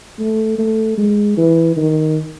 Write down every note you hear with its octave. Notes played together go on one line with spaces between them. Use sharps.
A3
A3
G#3
E3
D#3